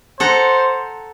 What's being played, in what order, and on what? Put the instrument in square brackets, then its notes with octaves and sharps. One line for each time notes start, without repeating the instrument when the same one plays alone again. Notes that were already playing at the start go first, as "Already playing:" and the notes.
[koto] A4 F#5 A#5 [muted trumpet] C5